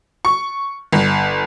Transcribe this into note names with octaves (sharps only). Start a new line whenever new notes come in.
C#6
G1